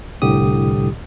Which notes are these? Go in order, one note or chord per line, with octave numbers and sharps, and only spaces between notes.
C2 A2 D3 G4 D#6